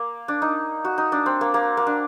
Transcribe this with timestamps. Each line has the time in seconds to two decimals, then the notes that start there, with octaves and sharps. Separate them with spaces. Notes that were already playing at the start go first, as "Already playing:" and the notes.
Already playing: A#3
0.28 D4
0.42 D#4
0.85 F#4
0.98 D#4
1.12 D4
1.26 C4
1.41 A#3
1.54 A#3
1.77 A#3
1.87 D4